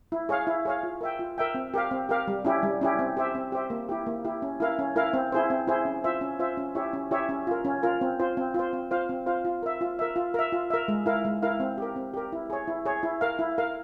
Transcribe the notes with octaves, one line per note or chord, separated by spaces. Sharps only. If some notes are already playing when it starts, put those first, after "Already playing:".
E4
G#4 C#5 F5
E4
G#4 C#5 F5
F4
A#4 E5 G5
F4
A#4 E5 G5
C4
G4 A#4 F5
C4
G4 A#4 F5
G3
C#4 E4 G4
G3
C#4 E4 G4
C4
G4 C5 E5
C4
G4 C5 E5
A#3
E4 G4
A#3
E4 G4
C#4
E4 A#4 F5
C#4
E4 A#4 F5
C4
E4 G#4 C5
C4
E4 G#4 C5
C#4
F4 C5 E5
C#4
F4 C5 E5
C#4
E4 G4 C#5 E5
C#4
E4 G4 C#5 E5
C#4
F4 A#4
C#4
F4 A#4
C4
F4 C5
C4
F4 C5
C4
F4 C5 F5
C4
F4 C5 F5
F4
A#4 E5
F4
A#4 E5
F4
A#4 E5
F4
A#4 E5
G#3
E4 A#4 F5
G#3
E4 A#4 F5
C4
G4 A#4
C4
G4 A#4
E4
G#4 C#5
E4
G#4 C#5
E4
A#4 F5
E4
A#4 F5